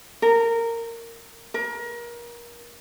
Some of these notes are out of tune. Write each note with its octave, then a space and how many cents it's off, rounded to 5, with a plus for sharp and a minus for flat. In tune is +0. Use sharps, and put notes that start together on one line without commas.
A#4 -15
A#4 +30